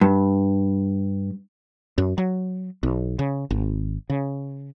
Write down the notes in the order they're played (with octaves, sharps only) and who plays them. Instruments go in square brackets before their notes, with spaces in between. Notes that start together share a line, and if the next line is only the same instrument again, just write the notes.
[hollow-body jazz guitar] G2
[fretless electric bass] F#2
F#3
B1
C#3
G#1
C#3